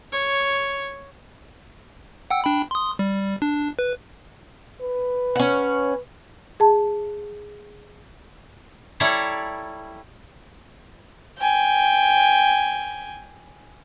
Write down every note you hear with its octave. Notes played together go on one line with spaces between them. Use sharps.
C#5
F#5 G5 E6
D4 G5 B5
C6 D#6
G3
D4
B4
B4
C#4 F#5
G#4 A5
G3 E4 A4 C#5 D5 A#5
G5 G#5